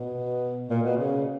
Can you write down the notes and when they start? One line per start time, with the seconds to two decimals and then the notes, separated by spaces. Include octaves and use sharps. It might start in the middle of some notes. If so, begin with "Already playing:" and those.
Already playing: B2
0.68 A#2
0.83 B2
0.97 C#3